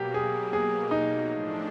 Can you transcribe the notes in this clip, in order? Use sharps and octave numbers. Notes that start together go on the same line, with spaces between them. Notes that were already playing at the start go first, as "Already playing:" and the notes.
Already playing: B2 F#3 A#3 G4
G#4
G#4
D#4
A2 F3 A3 D4